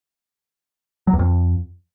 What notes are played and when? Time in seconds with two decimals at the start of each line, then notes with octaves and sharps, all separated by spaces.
1.07 F#3
1.13 E2
1.19 F2